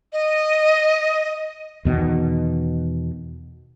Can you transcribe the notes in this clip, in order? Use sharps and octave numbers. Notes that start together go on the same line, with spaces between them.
D#5
E2 B2 D#3